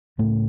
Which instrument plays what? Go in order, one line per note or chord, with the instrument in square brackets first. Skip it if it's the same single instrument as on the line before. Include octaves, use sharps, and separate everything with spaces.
[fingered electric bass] C#2 A2 C#3 A3